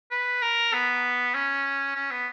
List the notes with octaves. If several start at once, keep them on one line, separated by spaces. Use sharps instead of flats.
B4
A#4
B3
C#4
C#4
B3